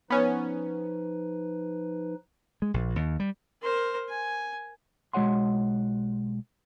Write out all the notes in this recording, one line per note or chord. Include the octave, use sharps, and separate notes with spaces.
F3 B3 C#4 D#4 B4
G#3
A#1
D#2
G3
A#4 C5
G#5
B1 G#3 F#4 C#5 F#5 C6